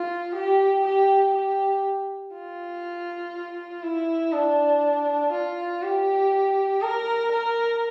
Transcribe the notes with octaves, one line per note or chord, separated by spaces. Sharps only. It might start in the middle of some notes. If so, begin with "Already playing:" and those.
Already playing: F4
G4
G4
G4
F4
E4
D4
F4
G4
A#4
A#4